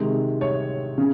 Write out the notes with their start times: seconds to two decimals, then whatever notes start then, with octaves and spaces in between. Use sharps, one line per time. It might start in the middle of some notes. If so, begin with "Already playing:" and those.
Already playing: C3 D#3 G#3
0.41 C#5
0.98 C#3